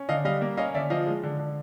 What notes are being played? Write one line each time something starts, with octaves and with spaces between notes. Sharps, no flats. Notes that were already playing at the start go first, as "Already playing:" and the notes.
Already playing: C#4
D3 D#5 F5
G3 D#5 F5
A#3
C#4 D#5 F5
D3 D5 E5
F3 D#5 F5
G#3
D3
D3